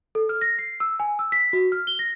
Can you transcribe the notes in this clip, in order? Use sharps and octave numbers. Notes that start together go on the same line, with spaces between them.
A4
F6
A#6
C7
E6
G#5
E6
B6
F#4
F6
G7
A#6